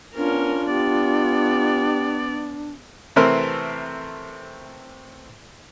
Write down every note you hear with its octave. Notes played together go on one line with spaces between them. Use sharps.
B3 C#4 D4 F4 A#4
B3 G4 D5
C3 E3 A3 C4 A#4 C5